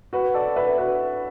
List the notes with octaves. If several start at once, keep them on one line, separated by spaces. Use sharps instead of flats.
F#4 B4
A4 D5
B4 E5
F#4 B4